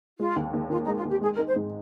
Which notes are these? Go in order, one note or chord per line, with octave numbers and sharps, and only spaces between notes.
G#3 F4
D#2
D#2
D#3 F4
D#4
G#3
F4
D#2 G4
G#3 G#4
A#4
D#4
C5
G#2